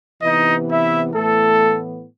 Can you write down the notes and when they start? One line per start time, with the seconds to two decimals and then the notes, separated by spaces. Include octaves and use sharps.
0.21 C3 E3 B3 D#4 D#5
0.68 E4 E5
1.14 A2 E3 A3 B3 A4